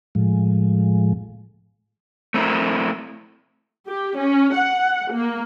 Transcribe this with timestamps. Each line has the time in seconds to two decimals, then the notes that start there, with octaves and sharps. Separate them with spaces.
0.15 A2 F3 G#3
2.34 A3 C4 E4 A#4
3.89 G4
4.18 C#4
4.55 F#5
5.14 A#3